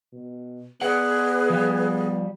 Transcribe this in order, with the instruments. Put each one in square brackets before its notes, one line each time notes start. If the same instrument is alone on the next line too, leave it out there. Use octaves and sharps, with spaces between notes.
[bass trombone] B2
[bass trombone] B3 [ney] G#4 [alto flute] B4 [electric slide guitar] D5 F#5
[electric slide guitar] F3 G3